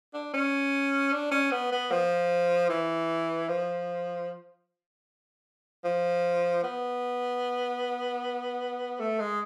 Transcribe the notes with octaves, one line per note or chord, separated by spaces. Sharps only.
D4
C#4
D4
C#4
B3
B3
F3
E3
F3
F3
B3
A3
G#3